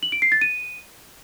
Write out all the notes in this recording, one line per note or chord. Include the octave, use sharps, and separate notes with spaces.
F#7
D7
C7
A6
D#7